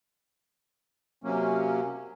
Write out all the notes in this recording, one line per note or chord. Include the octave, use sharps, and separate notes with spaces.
C3 F#3 A#3 C#4